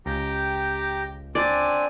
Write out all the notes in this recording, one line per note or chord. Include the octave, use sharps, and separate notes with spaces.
C#2 G4 G5 A#5
C4 D4 D5 G#5